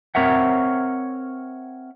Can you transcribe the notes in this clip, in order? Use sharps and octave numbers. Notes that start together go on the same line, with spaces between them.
C4 A#4 C#5 E5 F#5